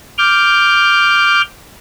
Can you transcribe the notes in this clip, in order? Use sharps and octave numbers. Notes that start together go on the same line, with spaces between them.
D6 F6 G6